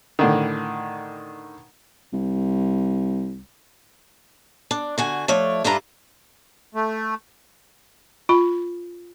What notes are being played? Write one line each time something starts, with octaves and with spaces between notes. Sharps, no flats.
A2 D3 D#3
C2
D4
D3 F#4 G#5
F3 A3 C#5 D5
G2 D4 F4 B4 E5 A#5
A3
F4 B5